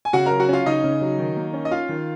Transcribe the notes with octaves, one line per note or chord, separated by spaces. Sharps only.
G#5
C#3 F#4 F#5
F#3 A#4 A#5
F#4 F#5
C#4 F4 F5
C#3 D#4 D#5
C#3
F#3
D#3
A#3
C#4
D#5
F4 F5
D#3